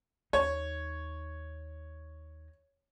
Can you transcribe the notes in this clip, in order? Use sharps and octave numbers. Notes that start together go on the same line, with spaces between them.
D#2 D#4 C#5